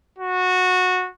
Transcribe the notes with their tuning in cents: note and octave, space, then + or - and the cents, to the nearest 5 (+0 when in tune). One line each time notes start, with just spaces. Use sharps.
F#4 -15